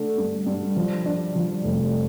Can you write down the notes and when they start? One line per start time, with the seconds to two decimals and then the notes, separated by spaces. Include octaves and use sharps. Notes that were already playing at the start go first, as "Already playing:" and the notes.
Already playing: D3 A3
0.18 G2
0.46 G2
0.76 F3
1.06 D4
1.35 F3
1.64 F1